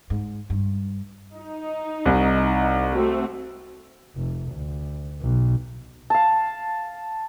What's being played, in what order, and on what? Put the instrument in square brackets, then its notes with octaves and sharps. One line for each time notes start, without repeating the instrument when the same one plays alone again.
[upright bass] G#2
G2
[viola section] D#4
[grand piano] C2
[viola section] A3 C4 F#4
[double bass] F1
D2
B1
[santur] F5 A5